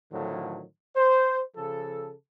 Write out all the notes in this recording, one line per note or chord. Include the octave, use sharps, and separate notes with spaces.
A2 D3 D#3 F3 F#3
C5
C#3 F3 A4